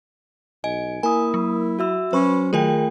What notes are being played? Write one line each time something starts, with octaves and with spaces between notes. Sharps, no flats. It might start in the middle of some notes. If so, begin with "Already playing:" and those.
B1 D#5 G#5 D7
A#3 E4 A#4 G#5 D#6
F#3
F#4 E5 E6
F#3 C#4 B4 C5 B5 C#6
D#3 A3 F4 G#4 A#4 G5 G#5